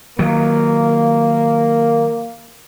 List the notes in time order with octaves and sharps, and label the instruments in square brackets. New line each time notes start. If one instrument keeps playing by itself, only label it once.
[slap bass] D#3 F#3 [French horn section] A#3